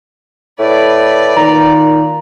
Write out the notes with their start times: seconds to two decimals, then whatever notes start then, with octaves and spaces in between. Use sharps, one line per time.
0.59 A2 B4 D5
1.37 A#2 D#3 A#5